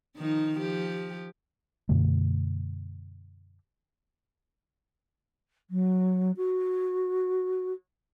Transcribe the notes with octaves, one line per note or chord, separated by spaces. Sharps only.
D#3 F3 D#4
F3 G4
F#2 B2 D3 A3
F#3
F#4